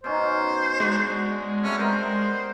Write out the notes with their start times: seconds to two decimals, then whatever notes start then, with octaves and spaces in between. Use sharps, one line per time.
0.04 B2 C#4 D#4 C5
0.80 G#3 D4 F#4
1.63 C3 G3 A3 C#4
1.78 B3 A#4 C5